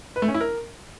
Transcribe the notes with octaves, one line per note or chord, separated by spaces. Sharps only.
B4
A3
C#4
E4
A#4